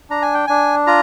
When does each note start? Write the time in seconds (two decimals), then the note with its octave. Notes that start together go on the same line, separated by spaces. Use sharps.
0.10 D4 A#5
0.22 G#5
0.34 G5
0.47 D4 G#5
0.87 F4 A#5